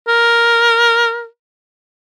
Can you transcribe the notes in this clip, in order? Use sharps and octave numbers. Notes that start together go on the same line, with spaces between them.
A#4